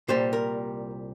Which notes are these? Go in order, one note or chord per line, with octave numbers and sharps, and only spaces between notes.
C2 A#2 G3 C5
A#4